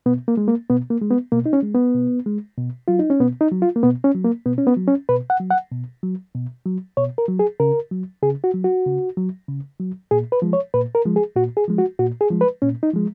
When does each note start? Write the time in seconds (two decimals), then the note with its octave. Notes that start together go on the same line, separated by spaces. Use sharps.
0.06 B2 B3
0.28 A#3
0.37 G#3
0.48 A#3
0.70 B2 B3
0.90 A#3
1.01 G#3
1.11 B3
1.32 B2 A#3
1.46 D#4
1.53 C#4
1.63 G#3
1.74 B3
1.95 B2
2.26 G#3
2.58 B2
2.88 F#3 F4
2.99 D#4
3.10 C#4
3.20 B2 B3
3.41 D#4
3.52 F#3
3.62 F4
3.76 A#3
3.83 B2 B3
4.04 C#4
4.15 F#3
4.24 A#3
4.46 B2 B3
4.58 C#4
4.67 B3
4.77 F#3
4.88 C#4
5.09 B2 B4
5.30 F#5
5.40 F#3
5.50 F#5
5.72 B2
6.03 F#3
6.34 B2
6.66 F#3
6.97 B2 C#5
7.18 A#4
7.29 F#3
7.39 G#4
7.60 C#3 A#4
7.91 F#3
8.23 C#3 G#4
8.44 F#4
8.54 F#3
8.64 F#4
8.86 C#3
9.17 F#3
9.48 C#3
9.80 F#3
10.11 A#2 G#4
10.32 B4
10.42 F3 G#3
10.53 C#5
10.74 A#2 B4
10.95 A#4
11.05 F3 G#3
11.16 G#4
11.36 A#2 F#4
11.57 G#4
11.68 F3 G#3
11.78 F#4
11.99 A#2 F#4
12.21 G#4
12.30 F3 G#3
12.41 B4
12.62 A#2 C#4
12.83 D#4
12.93 F3 G#3